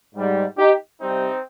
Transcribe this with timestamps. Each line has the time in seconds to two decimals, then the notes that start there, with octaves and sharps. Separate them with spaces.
0.15 G#2 G3
0.58 D#4 G4
1.01 C3 G3 C4 D#4